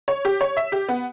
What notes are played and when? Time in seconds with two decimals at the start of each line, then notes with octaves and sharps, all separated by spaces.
0.08 C#5
0.25 G4
0.41 C#5
0.57 E5
0.72 G4
0.89 B3